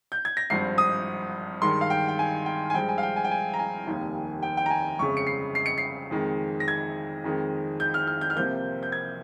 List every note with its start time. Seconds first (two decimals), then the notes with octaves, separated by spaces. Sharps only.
0.12 G6
0.25 G#6
0.37 A#6
0.50 G#1 G2 F3 C7
0.78 D#6
1.62 G2 D#3 G#3 C6
1.81 F5
1.90 G5
2.08 G5
2.19 G#5
2.46 G5
2.70 G#5
2.74 G2 F3 G#3 G5
2.89 G#5
2.98 F5
3.03 G5
3.16 G#5
3.24 G5
3.31 G#5
3.54 A#5
3.59 G#5
3.86 F1 D#2 D#3 G3 A#3
4.43 G5
4.57 G5
4.66 A#5
4.70 G#5
4.99 G1 F2 C#3 G#3 C#6
5.17 C#7
5.27 C7
5.55 C7
5.66 C#7
5.78 C7
6.11 F2 D#3 G#3
6.60 A#6
6.68 G#6
7.24 F2 D#3 G#3
7.80 G6
7.94 F6
8.07 F6
8.21 G6
8.30 F6
8.36 C2 C3 F3 A#3 G6
8.83 G6
8.92 G#6